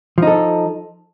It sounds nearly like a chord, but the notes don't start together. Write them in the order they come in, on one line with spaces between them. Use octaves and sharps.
F3 D#4 A4